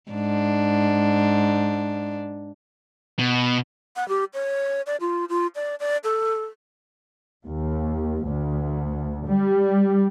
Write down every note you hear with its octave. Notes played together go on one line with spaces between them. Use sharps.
G#2 D4
B2
F#5
G4
C#5
D5
F4
F4
D5
D5
A4
D#2
D2
G3